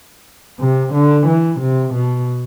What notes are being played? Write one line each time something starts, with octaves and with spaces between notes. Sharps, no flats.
C3
D3
E3
C3
B2